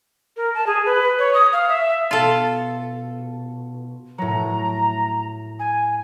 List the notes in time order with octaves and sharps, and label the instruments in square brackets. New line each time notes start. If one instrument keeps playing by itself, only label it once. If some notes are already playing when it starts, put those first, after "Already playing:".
[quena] A#4
A5
G#4
B4
C#5
D#6
F5
E5
[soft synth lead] B2 [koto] F4 A4
[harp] A2 F#3 [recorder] A#5
[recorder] G#5